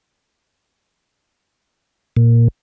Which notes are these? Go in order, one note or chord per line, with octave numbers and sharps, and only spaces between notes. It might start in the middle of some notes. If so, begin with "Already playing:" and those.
A#2